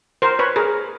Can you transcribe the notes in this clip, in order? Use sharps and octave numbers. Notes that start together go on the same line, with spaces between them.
A#4 C5
B4 C#5
G#4 A#4